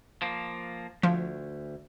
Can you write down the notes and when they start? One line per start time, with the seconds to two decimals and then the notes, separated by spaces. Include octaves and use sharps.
0.22 F3 A#3
1.03 D2 F3